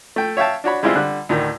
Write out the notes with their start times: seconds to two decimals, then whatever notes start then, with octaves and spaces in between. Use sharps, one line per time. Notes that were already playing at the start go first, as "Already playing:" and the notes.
0.16 A3 G5
0.37 C#5 E5 F5 G5 A5
0.64 D4 F#4 C#5 B5
0.83 G3 G#3 C4 E4 F4 C5
0.96 D3 G3 F#6
1.29 D2 A2 D#3